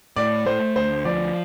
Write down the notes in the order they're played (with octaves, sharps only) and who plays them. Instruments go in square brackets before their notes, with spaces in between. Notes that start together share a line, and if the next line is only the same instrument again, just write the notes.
[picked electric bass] A2 [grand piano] D5
[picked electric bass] A3 [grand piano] C5
[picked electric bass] D2 [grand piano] C5
[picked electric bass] F3 [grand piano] D5